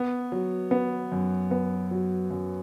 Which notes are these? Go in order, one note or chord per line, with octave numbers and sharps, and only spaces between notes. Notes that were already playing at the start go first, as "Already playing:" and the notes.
Already playing: B3
F#3
B3
F#2
B3
F#3
F#2